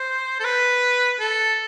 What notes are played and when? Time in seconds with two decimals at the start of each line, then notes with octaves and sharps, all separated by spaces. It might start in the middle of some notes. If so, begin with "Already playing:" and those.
Already playing: C5
0.40 A4
0.44 B4
1.20 A4